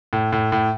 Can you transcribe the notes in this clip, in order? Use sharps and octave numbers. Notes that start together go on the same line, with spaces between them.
A2
A2
A2